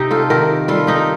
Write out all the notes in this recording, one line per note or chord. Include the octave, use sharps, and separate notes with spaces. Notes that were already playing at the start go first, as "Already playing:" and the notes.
Already playing: C3 D#4 G4
F4 A4
D#3 G4 A#4
G3 F4 A4
D#4 G4